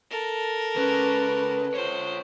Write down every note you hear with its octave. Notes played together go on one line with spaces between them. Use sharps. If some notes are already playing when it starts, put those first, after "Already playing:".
A4 A#4
C#2 C#4 B4
F4 C5 C#5